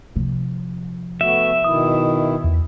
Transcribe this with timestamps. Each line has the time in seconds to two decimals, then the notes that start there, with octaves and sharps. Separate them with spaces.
0.16 C3 F3
1.21 A3 B3 F#4 E5
1.64 B2 D#3 E4 D#6
2.44 E2